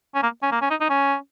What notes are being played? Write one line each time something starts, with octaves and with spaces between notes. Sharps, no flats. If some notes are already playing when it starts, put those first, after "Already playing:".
C#4
A#3
C#4
A#3
C#4
D#4
D#4
C#4